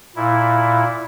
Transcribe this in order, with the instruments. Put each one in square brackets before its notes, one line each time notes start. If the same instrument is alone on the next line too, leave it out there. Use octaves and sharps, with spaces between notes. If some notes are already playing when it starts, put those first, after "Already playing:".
[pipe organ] A#2 E4